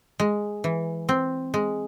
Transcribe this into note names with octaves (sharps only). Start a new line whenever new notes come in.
G#3
E3
C4
G#3